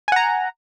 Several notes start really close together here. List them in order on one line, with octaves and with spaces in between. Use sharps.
G#5 F#5 A#5